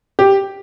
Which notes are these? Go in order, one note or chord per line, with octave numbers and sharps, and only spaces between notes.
G4